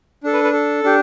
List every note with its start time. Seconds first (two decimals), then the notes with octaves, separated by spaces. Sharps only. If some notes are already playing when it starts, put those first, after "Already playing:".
0.24 D4 A4
0.33 B4
0.43 B4
0.53 A4
0.84 D4 G4